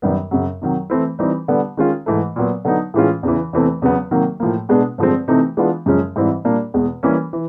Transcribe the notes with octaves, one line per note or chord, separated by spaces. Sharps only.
F#2 D#3 G3 B3
F#2 C#3 F#3
C3 D#3 F#3
E3 A3 C4 E4
E3 G3 C4 D#4
D3 G3 B3
D#3 G#3 C#4 F4
G#2 E3 A3
A#2 F#3 B3
D3 F#3 B3 D#4
A2 E3 G#3 C#4 F4
E2 C#3 E3
E2 C3 E3 A3 C4
E2 C#3 F#3 B3
C3 D#3 F#3 A#3
A2 F3 A#3
B2 G#3 B3 D4
G2 D3 F3 G#3 C4
C3 E3 A3 C4 D#4
E3 G#3 B3 D4 F4
F#2 C#3 F3 G#3 C#4
G#2 E3 G3 C4 E4
A#2 G3 A#3 D4
E2 B2 G#3
E3 G3 A#3 C#4
E3